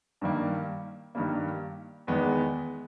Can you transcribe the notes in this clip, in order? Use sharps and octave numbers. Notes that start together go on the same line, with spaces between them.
G2 D#3 G3 A#3
G2 D#3 G3 A#3
E2 D#3 G#3 B3